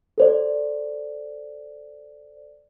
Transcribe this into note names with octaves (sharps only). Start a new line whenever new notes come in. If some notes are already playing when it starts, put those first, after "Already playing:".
A4 C5 D5